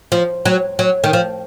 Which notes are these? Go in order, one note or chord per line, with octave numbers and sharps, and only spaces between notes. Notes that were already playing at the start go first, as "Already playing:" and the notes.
F3
F#3
F#3
D#3
F3